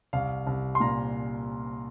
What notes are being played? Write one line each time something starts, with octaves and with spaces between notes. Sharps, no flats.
C2 F5
C2
C6
A#2 A#5